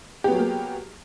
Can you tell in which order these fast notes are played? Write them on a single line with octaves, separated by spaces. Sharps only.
G4 B3 F#3 G#4 A#3